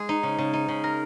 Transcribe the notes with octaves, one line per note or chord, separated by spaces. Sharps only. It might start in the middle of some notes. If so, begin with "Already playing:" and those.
Already playing: G#3 G#4
D#4
C#3
C#3
D#4
C#3
A#4